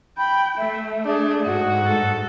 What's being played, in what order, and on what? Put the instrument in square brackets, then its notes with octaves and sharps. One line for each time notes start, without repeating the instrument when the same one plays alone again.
[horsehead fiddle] G5 [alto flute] B5
[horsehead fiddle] A3 [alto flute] E5
[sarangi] D4 [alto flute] G#4
[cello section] G#2 [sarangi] F#4
[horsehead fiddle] A4